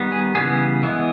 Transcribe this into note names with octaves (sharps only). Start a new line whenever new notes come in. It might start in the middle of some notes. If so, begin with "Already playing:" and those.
Already playing: D#3 G3 B3
G#4
C#3 E3 G3 B3 G#4
E3 G#3 B3